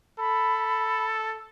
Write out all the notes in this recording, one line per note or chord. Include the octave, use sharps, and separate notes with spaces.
A4 B5